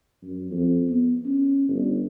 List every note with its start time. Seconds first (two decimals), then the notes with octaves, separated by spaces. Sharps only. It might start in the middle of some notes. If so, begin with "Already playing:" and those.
0.23 F#2
0.51 F2
0.89 B3
1.25 C#4
1.68 G1